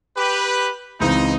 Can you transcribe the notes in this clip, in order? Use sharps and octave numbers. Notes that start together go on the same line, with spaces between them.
G4 B4
C#2 E3 C4 D#4